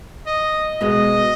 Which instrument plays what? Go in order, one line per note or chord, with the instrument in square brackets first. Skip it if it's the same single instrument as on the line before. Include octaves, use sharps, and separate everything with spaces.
[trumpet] D#5
[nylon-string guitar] B2 G#3 B3 [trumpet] D#5